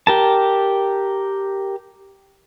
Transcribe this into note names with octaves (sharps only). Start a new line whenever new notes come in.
G4 A#4 A5